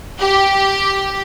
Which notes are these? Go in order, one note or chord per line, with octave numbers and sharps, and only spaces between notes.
G4